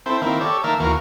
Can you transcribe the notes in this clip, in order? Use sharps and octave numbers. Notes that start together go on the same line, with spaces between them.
C4 E4 A4 C5
D#3 A#3 C4 E4
G4 A4 C#5 D5
D#3 A#3 A#4 E5 A5
D#2 E3 A#3 F#4 A#4